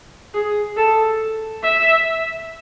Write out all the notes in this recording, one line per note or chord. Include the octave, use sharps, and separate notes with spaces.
G#4
A4
E5